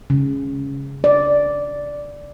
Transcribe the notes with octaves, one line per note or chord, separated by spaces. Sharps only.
C#3
D5